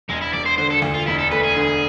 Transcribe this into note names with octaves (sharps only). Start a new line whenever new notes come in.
E1 G#3
E4
E1 D5
C5
D3 C5
A4
D2
F4
E1 E4
A4
A3 B4
G#4
D3